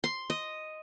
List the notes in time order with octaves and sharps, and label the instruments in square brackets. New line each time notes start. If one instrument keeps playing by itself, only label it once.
[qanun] C6
D#5